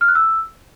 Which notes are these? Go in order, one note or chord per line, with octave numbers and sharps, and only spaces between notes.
F6
F#6
E6